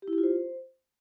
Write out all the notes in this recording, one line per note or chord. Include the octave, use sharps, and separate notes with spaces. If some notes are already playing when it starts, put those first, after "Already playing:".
G4
E4
G4
F4
C5